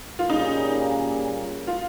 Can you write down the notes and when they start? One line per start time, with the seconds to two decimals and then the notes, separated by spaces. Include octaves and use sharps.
0.19 F4
0.29 A#2 G3 A#3 C#4 D#4 G#4
1.67 F4